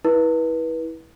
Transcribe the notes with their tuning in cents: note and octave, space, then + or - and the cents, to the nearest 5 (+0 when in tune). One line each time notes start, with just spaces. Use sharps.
E4 -25 B4 -30